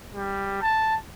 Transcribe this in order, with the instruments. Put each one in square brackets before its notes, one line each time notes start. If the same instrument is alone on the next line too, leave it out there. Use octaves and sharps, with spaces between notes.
[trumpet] G3
A5